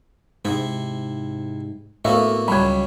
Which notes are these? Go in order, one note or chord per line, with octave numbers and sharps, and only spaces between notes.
G#2 C3 E4
A2 A#3 B3 F#4 A4 E5 F5
C#2 F#3 G3 B5 G#6